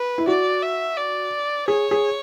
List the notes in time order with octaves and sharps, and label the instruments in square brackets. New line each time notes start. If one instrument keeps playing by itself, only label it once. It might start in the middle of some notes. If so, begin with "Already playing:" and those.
Already playing: [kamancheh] B4
[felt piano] E4
[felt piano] F#4 [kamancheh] D5
[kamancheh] E5
D5
[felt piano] G#4 [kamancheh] C#5
[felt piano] G#4